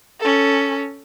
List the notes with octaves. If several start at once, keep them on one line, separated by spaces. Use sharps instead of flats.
C#4 A4